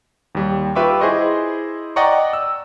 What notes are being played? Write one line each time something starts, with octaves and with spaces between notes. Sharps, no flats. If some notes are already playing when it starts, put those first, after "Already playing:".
D#2 G3
F4 G4 B4 E5 C#6 D6
E4 G#4 C5 D#5 C#6
D5 D#5 F#5 G5 A#5 C#6
E6